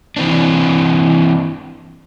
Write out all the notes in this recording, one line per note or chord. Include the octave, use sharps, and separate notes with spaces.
E3 C4 D4